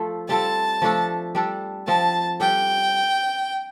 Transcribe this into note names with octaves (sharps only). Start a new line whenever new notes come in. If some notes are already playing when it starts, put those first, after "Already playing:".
Already playing: F3 A3 F4 A4
G3 C4 F4 A4 A5
F3 A3 D4 A4
G3 D4 A4
F3 C4 F4 A5
G3 D4 A4 G5